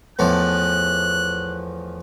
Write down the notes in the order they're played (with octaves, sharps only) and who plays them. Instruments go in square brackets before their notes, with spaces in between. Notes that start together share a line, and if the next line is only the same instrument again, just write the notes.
[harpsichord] E2 A2 F3 [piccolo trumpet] F#6